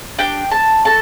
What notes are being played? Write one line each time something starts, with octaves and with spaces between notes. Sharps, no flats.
D4 G4 G5
A5
F#4 A4 A5